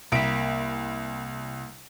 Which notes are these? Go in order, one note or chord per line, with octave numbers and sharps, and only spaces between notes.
C2 A#3 B5 D7